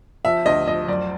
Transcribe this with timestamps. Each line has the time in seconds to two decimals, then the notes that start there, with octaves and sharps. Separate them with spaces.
0.25 F3 E5
0.46 D2 D#5
0.67 F3 D#5
0.88 F#2 D5